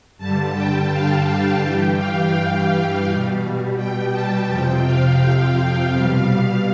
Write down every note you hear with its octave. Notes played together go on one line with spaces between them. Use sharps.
G2 D3 G3 A5
G5
F5
G2 E3 G3 G5
F5
B2 G3
G5
A5
F2 C3 F3 G5
F5
B2 G3